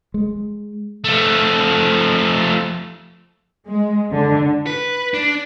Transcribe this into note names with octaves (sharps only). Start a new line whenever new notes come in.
G#3
F3 A3
G#3
D3
B4
D4